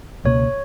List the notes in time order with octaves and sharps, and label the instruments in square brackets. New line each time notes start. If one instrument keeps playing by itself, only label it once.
[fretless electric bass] C#2 B2 A#3 [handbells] C#5